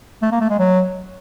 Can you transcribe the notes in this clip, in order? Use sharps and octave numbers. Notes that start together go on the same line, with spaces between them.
A3
A#3
A3
G#3
F#3